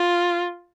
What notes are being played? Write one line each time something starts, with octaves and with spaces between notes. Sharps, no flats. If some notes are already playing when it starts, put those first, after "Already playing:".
Already playing: F4